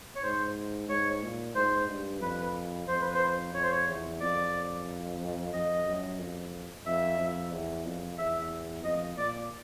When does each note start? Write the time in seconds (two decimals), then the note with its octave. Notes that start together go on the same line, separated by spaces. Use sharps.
0.15 C#5
0.22 G#2 C5
0.89 G#2 C#5
1.23 A#2
1.55 G#2 C5
1.88 G2
2.21 F2 B4
2.88 F2 C5
3.01 B4
3.14 C5
3.54 F2 C#5
3.63 C5
3.71 C#5
3.87 E2
4.20 F2 D5
5.53 F2 D#5
5.86 F#2
6.19 F2
6.86 F2 E5
7.19 F2
7.51 E2
7.85 F2
8.18 E2 E5
8.84 F2 D#5
9.17 A#2 D5